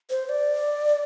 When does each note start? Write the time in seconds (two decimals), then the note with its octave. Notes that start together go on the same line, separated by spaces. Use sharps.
0.10 C5
0.29 D5